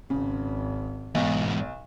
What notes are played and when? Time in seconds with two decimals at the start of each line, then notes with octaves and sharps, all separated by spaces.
0.10 G#1 C#3
1.15 B1 E2 G#2